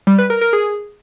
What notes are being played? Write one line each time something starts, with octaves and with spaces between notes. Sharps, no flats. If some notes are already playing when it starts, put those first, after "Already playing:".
G3
B4
A#4
A#4
G#4